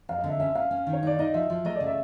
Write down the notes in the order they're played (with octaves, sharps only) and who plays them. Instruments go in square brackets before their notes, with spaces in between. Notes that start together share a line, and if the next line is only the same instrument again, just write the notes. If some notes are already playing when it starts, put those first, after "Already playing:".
[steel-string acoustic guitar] F2 [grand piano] F5
[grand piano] D#5
[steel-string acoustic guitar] D3
[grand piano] E5
[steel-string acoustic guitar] C#4 [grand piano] E5
[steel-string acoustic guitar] C#4 [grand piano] F5
[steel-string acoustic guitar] C#4
D#3
[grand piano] C#5
[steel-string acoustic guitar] D#4 [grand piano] D5
[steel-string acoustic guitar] D#4 [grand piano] D#5
[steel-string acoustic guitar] F3 [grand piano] E5
[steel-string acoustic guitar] F3
[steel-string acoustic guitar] A3 [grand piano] D#5
[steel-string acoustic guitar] C#3 [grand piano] D5
[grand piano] E5